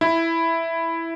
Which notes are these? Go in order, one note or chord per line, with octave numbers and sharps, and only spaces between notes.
E4